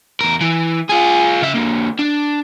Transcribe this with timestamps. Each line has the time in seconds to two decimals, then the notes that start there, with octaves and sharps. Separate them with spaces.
0.21 E2 A#4
0.41 E3
0.89 F4 G#4
1.42 C#3 E5
1.54 D3 A#3
1.99 D4